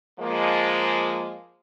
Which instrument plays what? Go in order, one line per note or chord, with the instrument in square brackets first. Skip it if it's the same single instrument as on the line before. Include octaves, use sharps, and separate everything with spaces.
[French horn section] F3 G#3 A#3